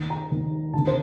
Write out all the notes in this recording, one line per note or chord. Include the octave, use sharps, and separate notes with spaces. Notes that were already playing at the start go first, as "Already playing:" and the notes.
Already playing: D#2 D#3
A#5
D#2 D#3
D2 C3 D#3 A5
C5